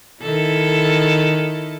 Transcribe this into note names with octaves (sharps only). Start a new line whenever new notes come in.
D#3 E4 A4